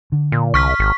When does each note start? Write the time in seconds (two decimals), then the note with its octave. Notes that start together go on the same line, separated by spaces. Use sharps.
0.12 D3
0.32 A#2
0.54 C2 C#6 F6 B6
0.79 G#1